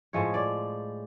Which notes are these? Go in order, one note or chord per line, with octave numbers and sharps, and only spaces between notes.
A2 F3 G#3 C#5
D5